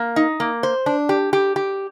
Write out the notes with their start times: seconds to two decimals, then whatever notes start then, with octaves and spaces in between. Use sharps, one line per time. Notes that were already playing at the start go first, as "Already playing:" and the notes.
Already playing: A#3
0.16 D#4
0.40 A#3
0.63 C5
0.86 D4
1.09 G4
1.33 G4
1.56 G4